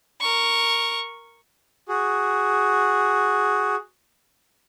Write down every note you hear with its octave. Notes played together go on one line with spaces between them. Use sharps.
A#4 C#6
F#4 G#4